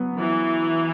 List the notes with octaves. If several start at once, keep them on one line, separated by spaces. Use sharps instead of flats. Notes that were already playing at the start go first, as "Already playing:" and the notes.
Already playing: F#3 B3
E3